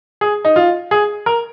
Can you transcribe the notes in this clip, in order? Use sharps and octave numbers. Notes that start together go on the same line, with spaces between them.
G#4
D#4
F4
G#4
A#4